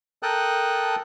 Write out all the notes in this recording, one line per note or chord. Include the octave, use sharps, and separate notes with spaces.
A4 A#4 G5 A5 D#6 F#6